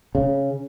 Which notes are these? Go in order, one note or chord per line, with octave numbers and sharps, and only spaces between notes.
C#3